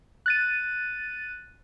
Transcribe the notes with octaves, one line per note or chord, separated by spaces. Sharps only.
F#6 A6 D#7